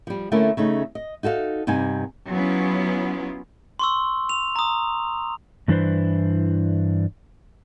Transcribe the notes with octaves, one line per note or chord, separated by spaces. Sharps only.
F3 G3
D3 A3 A#3 C#4 E4 A#4
C#3 A3 C#4 D#4
D#5
D#4 F#4 A4 C#5 F5
G2 C3 B3 D#4 G#5
F#3 B3 C#4 E4 F4
C6 C#6 E6
F7
A#5 D#6
G2 E3 D4 E4 B4 C5